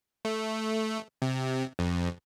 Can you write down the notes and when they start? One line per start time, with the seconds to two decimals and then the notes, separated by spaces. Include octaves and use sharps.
0.25 A3
1.22 C3
1.79 F2